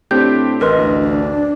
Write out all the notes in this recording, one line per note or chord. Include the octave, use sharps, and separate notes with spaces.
A2 C4 D4 G4 G6
A1 A#4 B4 D#5 C6
D2
D4